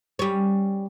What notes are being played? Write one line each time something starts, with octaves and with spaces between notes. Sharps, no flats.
G3 C#4